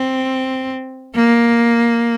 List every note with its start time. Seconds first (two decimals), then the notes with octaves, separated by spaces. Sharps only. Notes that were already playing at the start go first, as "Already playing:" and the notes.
Already playing: C4
1.15 A#3